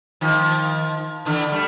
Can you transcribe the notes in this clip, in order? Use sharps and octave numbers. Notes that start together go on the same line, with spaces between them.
D#3 F3
D3 E3
G3 A3